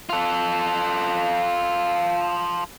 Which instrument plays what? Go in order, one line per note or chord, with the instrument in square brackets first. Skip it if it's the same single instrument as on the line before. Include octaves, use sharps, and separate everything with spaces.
[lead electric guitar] F4 A4